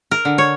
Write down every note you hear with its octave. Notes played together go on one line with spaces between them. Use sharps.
A#4
D3
C#5